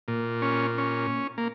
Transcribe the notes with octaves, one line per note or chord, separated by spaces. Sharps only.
A#2
C#4
C#4
A#3